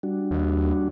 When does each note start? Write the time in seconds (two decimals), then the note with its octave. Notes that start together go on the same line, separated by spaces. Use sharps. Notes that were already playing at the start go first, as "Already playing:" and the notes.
0.03 G3 D4 F#4
0.31 D#2